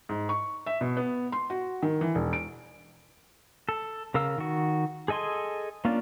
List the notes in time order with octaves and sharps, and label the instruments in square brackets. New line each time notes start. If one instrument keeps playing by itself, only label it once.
[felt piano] G#2
C#6
E5
B2
B3
C6
F#4
D#3
E3
E1
D7
[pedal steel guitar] A4
C#3 A#4 F5 E6
D#3 F#4
G#4 A4 D#5 G#5 C6
A#3 C#4 D4 F4 D5